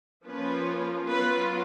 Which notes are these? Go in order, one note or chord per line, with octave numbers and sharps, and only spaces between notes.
F3 A#3 C#4 F4 B4
F#3 B3 F4 B4